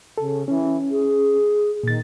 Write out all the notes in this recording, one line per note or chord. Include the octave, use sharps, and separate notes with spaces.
C#3 A4
E3 C#4
G#4
A#2 D#3 A6